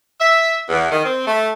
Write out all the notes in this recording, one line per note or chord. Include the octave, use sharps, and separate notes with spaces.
E5
E2
D#3
C4
A3